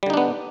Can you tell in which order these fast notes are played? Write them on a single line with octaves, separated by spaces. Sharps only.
G3 D3 D#4 D4 B3